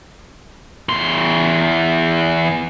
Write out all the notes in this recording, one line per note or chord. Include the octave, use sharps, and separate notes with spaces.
E2 C6